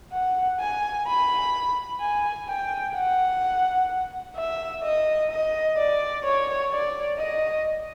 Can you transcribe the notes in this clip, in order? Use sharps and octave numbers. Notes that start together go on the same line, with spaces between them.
F#5
G#5
B5
G#5
G5
F#5
E5
D#5
D#5
D5
C#5
D5
D#5